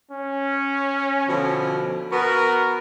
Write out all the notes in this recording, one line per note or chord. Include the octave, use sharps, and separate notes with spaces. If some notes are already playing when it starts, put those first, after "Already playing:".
C#4
B2 D3 F3
B3 F#4 A#4